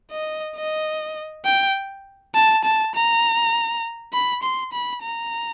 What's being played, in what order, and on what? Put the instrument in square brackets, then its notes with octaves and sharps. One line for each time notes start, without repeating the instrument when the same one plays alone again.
[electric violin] D#5
D#5
G5
A5
A5
A#5
B5
C6
B5
A#5